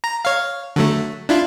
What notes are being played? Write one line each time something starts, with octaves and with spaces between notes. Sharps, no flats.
A#5
C#5 F5
D3 F#3 A3
D4 E4 F4